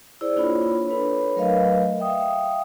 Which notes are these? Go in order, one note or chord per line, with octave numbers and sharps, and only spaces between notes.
E4 G#4 C5 D5
A#3 D4 E4 F4 C#5 B5
D4 A4 B4 C#5 B5
F#3 A3 A#4 B4 D#5 F5
E5 F5 G5 D#6